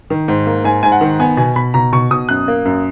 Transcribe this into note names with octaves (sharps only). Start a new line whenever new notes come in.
D#3
G#2
A#3
G#2 G#5
G#2 G#5
F#5
D#3
B3 G#5
B2 G#5
B2 B5
B2 A#5
B2 C#6
B2 D#6
F#2 F#6
A#3
F#2